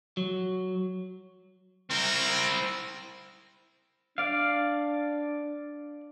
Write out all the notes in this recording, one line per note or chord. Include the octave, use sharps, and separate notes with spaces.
F#3
C4 E4 A#4
D4 D5 F5